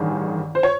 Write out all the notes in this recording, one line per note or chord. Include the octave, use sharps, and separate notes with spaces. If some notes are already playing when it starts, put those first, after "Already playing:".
Already playing: A1 G2 D#3 G#4
C5
C#5